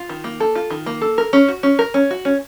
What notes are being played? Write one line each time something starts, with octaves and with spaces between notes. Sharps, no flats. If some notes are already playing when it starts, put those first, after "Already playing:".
Already playing: F4
D#3
A#3
A4
F4
D#3
A#3
A4
A#4
C#4
F#4
C#4
A#4
C#4
F#4
C#4